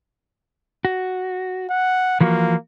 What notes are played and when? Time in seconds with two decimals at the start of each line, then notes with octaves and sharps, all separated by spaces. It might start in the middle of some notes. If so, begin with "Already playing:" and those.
0.85 F#4
1.70 F#5
2.21 E3 F3 A#3 F#4